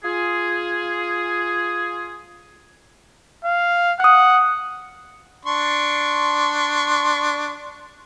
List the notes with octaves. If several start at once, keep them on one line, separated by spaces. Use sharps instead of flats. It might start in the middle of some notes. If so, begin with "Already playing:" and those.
F4 G#4
F5
F#5 D#6 F#6
D4 C6 C#6